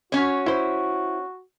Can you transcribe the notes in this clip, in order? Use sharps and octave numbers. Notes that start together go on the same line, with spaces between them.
C#4 F#4 C#5
E4 C5